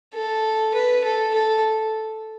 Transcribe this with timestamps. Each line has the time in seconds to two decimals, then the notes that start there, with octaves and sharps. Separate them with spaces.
0.14 A4
0.74 B4
1.04 A4
1.34 A4